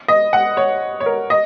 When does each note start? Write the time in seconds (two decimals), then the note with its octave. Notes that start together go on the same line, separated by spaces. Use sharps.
0.08 D#5
0.33 F#5
0.57 C#5
1.00 C#5
1.06 A#4
1.30 D#5